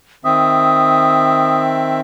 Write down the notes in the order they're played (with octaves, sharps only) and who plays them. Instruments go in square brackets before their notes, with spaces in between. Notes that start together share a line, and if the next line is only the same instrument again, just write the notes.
[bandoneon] D#3 C4 E5 [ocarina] D#6